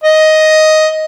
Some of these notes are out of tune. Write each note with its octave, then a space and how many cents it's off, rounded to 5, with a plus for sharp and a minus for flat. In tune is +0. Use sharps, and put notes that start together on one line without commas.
D#5 +5